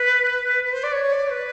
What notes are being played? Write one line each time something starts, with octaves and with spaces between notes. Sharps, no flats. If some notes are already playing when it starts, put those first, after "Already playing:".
Already playing: B4
B4
C5
D5
C#5
D5
B4